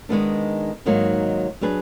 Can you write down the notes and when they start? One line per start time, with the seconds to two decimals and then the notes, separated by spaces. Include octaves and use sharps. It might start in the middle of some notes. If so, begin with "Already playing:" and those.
0.09 D#3 G#3 B3 D4
0.86 G#2 D#3 F#3 A#3 D#4
1.61 F#3 D4 G#4 B4